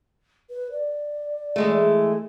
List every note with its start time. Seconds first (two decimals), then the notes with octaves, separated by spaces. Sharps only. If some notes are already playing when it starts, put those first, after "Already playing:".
0.50 B4
0.72 D5
1.56 E3 G#3 A3
1.75 G#4